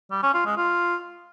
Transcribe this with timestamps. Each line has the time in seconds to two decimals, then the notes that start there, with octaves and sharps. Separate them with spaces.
0.11 G3
0.23 C#4
0.34 F4
0.45 G#3
0.57 F4